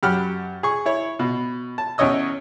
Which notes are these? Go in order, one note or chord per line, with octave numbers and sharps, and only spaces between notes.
F#2 G4 F#5 B5 F6
G#4 C#6
E4 C#5
B2
A5
E2 C#4 C#5 D#5 E6